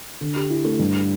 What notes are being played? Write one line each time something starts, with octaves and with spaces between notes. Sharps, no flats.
D3
G4
E4
A3
G2